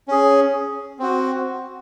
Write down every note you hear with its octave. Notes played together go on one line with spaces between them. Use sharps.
C#4 G#4
C4 F#4